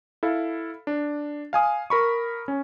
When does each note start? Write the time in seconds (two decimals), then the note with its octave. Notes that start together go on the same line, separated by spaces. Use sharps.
0.23 E4 A4 F5
0.87 D4
1.53 F5 G#5 D#6
1.90 A#4 B5 C#6
2.48 C#4